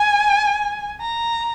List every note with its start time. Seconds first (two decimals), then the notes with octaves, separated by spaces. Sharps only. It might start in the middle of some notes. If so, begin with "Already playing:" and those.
Already playing: G#5
1.01 A#5